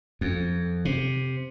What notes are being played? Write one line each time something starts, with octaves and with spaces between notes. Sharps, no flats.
F2
C3